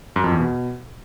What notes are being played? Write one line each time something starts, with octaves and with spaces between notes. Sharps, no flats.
F#2
F2
E2
B2